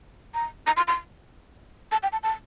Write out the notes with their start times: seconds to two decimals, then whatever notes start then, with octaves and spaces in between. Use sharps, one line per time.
0.34 A#5
0.67 A#5
0.77 C6
0.88 C6
1.92 A5
2.03 G5
2.12 A5
2.23 A5